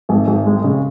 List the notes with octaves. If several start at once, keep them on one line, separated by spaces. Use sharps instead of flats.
G#1
G#1
G#3
C#3